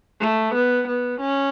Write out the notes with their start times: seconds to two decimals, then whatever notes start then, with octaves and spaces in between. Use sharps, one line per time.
0.20 A3
0.54 B3
0.87 B3
1.20 C#4